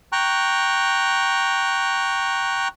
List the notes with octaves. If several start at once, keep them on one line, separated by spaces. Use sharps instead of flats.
G5 A#5 C#6 F#6